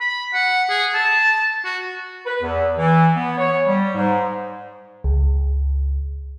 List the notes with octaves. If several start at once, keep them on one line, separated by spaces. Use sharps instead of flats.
B5
F#5
G#4
A5
F#4
B4
E2
E3
B3
C#5
G3
G#2
C#2